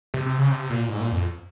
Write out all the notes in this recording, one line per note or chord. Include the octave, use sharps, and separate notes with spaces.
C3
C3
C#3
C3
A#2
G#2
A#2
F2